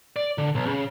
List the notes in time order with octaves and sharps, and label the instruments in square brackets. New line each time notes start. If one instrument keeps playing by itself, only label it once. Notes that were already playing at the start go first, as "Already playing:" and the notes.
[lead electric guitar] D5
D3
B1
C#3